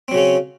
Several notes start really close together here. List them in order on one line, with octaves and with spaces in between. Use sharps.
C4 F#3 C#3 C#4